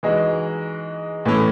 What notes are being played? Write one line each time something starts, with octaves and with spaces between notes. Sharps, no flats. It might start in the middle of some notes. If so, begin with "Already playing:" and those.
E3 G#3 D#4 F#4
A2 E3 A3 C#4